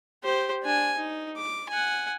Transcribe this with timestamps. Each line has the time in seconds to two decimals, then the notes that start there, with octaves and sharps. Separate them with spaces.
0.24 G4 C5
0.63 D4 G#5
0.98 D#4
1.37 D6
1.70 F#5 G#5